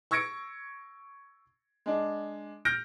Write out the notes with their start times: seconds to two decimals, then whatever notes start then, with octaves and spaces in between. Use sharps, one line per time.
0.11 C#6 E6 G#6 A#6 C#7 D7
1.86 G#3 D4
2.65 F6 G6 A#6 D7